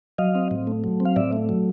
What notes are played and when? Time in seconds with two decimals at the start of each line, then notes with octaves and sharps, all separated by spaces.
0.18 F#3 D#5 F5
0.35 C4
0.51 A2
0.67 A3
0.84 F#3
1.00 C4
1.05 F5
1.16 A2 D5 E5
1.33 A3
1.49 F#3